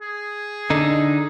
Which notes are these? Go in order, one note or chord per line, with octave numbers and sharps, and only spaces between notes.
G#4
D3 D#4